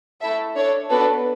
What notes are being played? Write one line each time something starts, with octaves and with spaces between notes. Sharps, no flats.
A3 E4 A4 E5
D4 A4 C#5
B3 D4 F#4 A4 B4